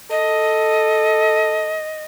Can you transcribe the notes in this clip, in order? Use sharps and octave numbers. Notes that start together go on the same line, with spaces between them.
A4 D#5